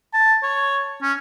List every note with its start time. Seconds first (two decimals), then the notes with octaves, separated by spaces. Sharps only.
0.13 A5
0.43 C#5
1.02 C#4